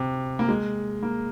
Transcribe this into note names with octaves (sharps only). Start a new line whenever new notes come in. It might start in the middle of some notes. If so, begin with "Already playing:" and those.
Already playing: C3
A#3
G#3
A#3